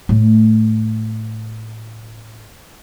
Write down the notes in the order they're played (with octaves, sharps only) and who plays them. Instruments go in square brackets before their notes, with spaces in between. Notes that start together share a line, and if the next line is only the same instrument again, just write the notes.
[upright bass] A2 A3